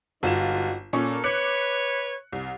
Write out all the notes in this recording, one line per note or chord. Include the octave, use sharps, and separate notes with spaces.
G1 G#2 G3 F4 F#4 E7
A#2 C#4 A4 A#4 C#6
B4 C#5 D6 F#6 C#7
C2